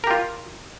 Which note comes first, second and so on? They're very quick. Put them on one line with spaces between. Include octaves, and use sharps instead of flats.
A#4 G4 F4